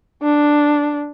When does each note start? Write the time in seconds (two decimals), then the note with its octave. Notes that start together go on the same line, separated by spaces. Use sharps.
0.22 D4